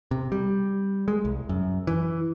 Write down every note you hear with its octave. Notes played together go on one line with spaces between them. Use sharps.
C3
G3
G#3
C2
F#2
E3